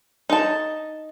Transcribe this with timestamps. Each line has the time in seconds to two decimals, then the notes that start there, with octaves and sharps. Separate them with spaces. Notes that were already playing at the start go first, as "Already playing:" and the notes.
0.30 D#4 A5